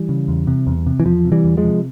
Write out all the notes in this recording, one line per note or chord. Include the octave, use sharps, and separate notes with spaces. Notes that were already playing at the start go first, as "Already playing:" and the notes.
Already playing: E3 G3
C#3
E2
C3
E2
C3
E3
E2 F3
C3
E3 G3
E2
F3 G#3
C3